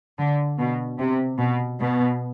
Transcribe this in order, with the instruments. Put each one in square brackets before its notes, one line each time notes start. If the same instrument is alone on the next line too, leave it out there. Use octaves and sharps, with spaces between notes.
[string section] D3
B2
C3
B2
B2